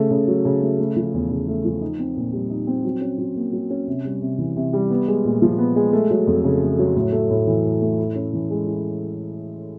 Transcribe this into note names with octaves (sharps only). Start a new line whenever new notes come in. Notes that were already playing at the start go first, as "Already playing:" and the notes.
Already playing: C#3 A3
C#3
F#3
C#3
A3
A3
F3
E2
C#3
A3
F3
D#4
C4
A#2
G3
D#4
C4
F#3
C#4
F#3
A#3
F#3
C#4
C3
G3
C3
E3
C3
G3
B3
G#3
A#2
F3
B3
G#3
A3
F#3
F2
C#3
A3
F#3
A2
A3
A2
E3
A2
A3
E4
C#4
E3
G#3
E4